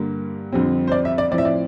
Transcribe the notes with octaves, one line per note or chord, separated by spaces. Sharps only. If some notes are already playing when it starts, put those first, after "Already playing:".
Already playing: G2 D3 G3 A#3
F2 D3 G3 C4
C5
D5
E5
D5
A2 F3 C4 D5
E5
D5